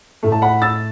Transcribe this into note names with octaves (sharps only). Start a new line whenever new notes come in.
A2 A3
A5
F#5 B5
E6 A6